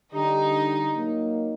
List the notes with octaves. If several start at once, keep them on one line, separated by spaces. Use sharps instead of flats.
D3 G3 D4 D#4 G4
F#3 A#3 D#4